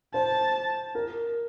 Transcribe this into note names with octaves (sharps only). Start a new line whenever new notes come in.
C5 A5
A#4